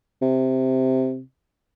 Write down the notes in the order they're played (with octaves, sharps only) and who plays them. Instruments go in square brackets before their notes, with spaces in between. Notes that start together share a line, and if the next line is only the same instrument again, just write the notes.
[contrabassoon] C3